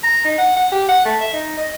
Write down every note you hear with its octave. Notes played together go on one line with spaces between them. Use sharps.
A#5
D#4
F#5
F#5
G4
F#5
A3
E5
D#4
D#5